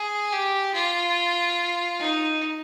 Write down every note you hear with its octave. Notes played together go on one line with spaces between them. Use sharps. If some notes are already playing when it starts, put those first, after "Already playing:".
Already playing: G#4
G4
F4
D#4